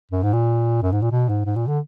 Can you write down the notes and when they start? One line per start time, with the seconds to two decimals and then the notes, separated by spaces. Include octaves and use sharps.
0.11 F#2
0.23 G#2
0.33 A#2
0.82 F#2
0.92 G#2
1.02 A#2
1.11 B2
1.29 G#2
1.46 G#2
1.56 A#2
1.67 D3